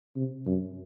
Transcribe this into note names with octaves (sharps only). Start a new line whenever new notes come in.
C3
F#2